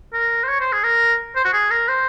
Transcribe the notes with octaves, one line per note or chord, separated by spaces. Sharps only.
A#4
C5
C#5
C5
G#4
A#4
C5
F#4
G#4
A#4
C5